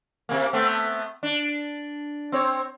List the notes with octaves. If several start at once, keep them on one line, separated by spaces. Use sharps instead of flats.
C3 A#3
A3 B3 C4
D4
C4 C#5